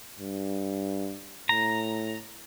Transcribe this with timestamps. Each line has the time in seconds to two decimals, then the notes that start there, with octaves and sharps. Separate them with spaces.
0.19 G2
1.49 A2 A#5